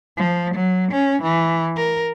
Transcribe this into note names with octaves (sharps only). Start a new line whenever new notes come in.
F3
F#3
C#4
E3
A#4